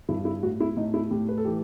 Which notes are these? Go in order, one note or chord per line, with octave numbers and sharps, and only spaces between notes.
G2 E4
E4
A2 F#4
E4
A2 D#4
E4
A2 G4
B4
A4
E3 G4